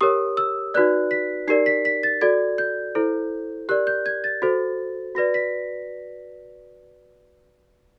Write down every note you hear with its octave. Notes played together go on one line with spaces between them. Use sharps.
G4 A#4 C#5 D#6
E6
D#4 F#4 B4 D5 F#6
B6
D#4 G4 A#4 D5 C7
B6
B6
A6
F#4 A4 D5 G#6
G6
E4 A4 C5
G4 A#4 D5 F#6
G6
G#6
A6
F#4 A4 C5
F#4 B4 D5 A#6
B6